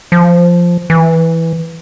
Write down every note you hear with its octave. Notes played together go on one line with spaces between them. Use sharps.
F3
E3